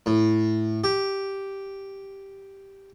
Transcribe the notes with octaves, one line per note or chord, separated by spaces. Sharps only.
A2
G4